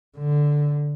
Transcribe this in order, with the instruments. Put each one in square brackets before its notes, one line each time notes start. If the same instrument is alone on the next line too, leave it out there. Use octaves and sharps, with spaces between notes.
[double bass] D3